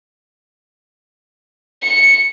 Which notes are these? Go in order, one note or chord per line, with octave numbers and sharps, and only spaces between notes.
C#7